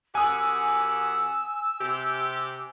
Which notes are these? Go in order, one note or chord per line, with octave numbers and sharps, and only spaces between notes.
F#2 G4 F#5 G#5 D#6 E6
E6
C3 G4